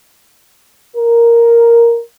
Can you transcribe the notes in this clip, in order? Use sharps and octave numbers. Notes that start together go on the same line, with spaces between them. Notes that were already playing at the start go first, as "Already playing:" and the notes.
A#4